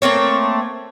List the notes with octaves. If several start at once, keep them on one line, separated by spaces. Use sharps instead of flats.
A3 A#3 C4 C#5